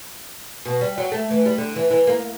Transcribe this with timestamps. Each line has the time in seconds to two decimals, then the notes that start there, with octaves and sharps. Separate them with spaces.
0.65 B2
0.81 G3
0.98 F#3
1.12 A3
1.31 E3
1.46 G3
1.58 D3
1.76 E3
1.91 E3
2.07 A#3